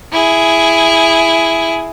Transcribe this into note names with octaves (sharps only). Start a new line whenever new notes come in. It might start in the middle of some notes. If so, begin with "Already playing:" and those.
E4 G#4